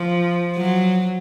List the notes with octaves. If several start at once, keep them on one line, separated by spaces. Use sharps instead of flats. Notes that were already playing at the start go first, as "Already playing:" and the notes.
Already playing: F3
F#3